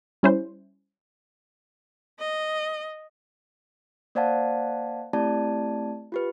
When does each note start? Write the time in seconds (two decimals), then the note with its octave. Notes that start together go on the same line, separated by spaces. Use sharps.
0.23 G3 C#4 E4 C5
2.19 D#5
4.15 A#3 C5 D5 F5 F#5 A5
5.13 A3 C4 E4 G4 D5 A5
6.12 F4 G4 B4